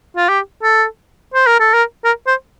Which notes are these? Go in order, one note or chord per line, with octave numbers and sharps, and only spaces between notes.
F4
G4
A4
C5
A#4
A4
A#4
A#4
C5